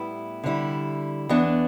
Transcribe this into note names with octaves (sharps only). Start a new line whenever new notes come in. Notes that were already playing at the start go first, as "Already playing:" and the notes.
Already playing: A2 G3 B3 E4
D3 G3 E4
E2 E3 B3 D4